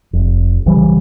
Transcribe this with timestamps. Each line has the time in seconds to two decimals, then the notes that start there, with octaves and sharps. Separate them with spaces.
0.13 F1
0.66 B1 C#3 E3 G3